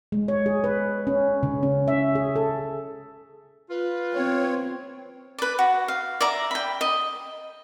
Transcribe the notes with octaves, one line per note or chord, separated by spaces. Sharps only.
G#3
C#5
G#4
B4
C#4
C#3
C#4
E5
G#4
A4
F4 B4
C4 C#5
B4 D5
F#4
F5
D5 E5 A#5
G5 B5
D#5